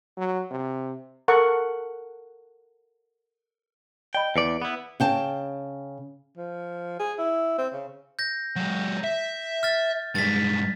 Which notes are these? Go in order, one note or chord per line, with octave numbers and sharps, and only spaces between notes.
F#3
C3
A4 A#4 F#5 C#6
D5 D#5 G5 B5
E2 B4 D5 C#7 D7
B3 E4
C#3 G5 A5
F3
G#4
E4
C4
C#3
G6 A#6
F#3 G#3
E5
F6 A6
G2 G#3 A6 B6